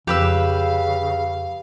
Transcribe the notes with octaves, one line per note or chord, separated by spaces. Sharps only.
F2 C#3 G4 B4 F5 E6